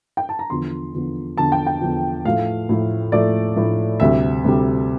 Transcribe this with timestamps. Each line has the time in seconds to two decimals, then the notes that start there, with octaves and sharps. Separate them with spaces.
0.17 G5
0.29 A5
0.39 A#5
0.50 E2 D3 F3 C6
0.94 E2 D3 F3
1.37 E2 D3 F3 A5
1.52 G5
1.67 G5
1.81 E2 D3 F3
2.25 A2 F3 A3 F5
2.69 A2 F3 A3
3.12 A2 F3 A3 D5
3.56 A2 F3 A3
4.00 D2 C3 G3 E5
4.44 D2 C3 G3